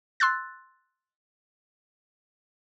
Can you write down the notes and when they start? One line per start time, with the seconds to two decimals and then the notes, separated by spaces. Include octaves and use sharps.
0.20 C6 E6 F#6 A6